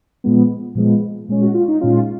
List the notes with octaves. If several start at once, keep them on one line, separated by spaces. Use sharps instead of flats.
A#2 F3 G#3 B3
A#2 F3 G#3 B3
A#2 G#3 C#4
F#4
F4
D#4
A#2 G#3 C#4 F4